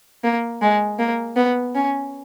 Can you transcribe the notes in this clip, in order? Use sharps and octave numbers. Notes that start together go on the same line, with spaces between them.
A#3
G#3
A#3
B3
C#4